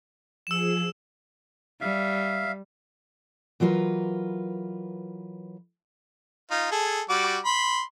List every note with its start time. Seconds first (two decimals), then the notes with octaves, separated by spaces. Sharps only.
0.47 F3 G#4 E6 E7
1.81 G3 E5 F5
3.60 E3 F#3 F4 G#4 A#4 B4
6.51 D#4 F4
6.71 G#4 A4
7.10 G3 F#4 D6
7.45 B5 C6